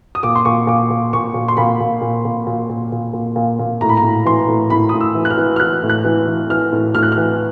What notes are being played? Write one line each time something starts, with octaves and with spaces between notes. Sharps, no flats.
D#6
A#2 D6
C6
A#2 C#6
A#2 D6
A#2
A#2 C#6
A#2
C6
A#2 B5
A#2
A#2
A#2
A#2
A#2
A#2
A#2
A#2
A#2
A2 A#5
B5
A#5
A2
E3 C6
A2
A2 B5
A2 D#6
E6
E3
F#6
F6
E3
F6
E3 F#6
A2
F#6
E3
E3
E3 F6
A2
A2 F6
F#6
F6
E3